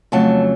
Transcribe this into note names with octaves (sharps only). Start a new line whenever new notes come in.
F2 C#3 F#3 A3 A5